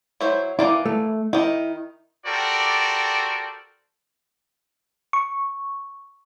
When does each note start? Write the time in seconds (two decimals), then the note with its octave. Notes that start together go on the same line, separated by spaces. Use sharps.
0.21 F#3 E4 C5
0.59 E3 A#3 E4 D5
0.85 A3
1.33 D#3 D#4 E4
2.25 F#4 G4 A4 A#4 C5 D5
5.13 C#6